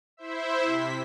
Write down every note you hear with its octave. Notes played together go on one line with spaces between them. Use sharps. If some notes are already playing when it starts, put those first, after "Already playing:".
E4 C5 E5
C3 B6